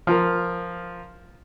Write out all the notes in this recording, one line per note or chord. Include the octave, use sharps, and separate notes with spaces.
F3 F4 A#4